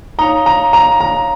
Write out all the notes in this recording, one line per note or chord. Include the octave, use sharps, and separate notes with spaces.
D#4 C#5 F5 A#5
A#5
A#5
A#5